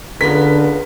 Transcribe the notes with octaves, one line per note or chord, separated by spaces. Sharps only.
C#2 D3 B3 F4 A#4 B6